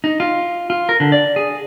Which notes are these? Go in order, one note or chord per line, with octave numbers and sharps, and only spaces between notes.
D#4
F4
F4
A#4
D3
D5
G#4